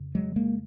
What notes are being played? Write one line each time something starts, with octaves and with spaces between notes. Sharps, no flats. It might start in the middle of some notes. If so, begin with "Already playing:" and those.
Already playing: F2 C#3
F#3 G#3
G#3 A#3